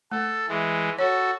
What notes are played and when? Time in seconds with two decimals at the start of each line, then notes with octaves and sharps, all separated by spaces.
0.12 A3 A4
0.49 E3 G#3
0.99 F#4 A4 C#5